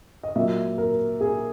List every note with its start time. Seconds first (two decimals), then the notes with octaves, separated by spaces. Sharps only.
0.23 D#5
0.36 A#2 F#3 E5
0.78 A#4
1.21 G#4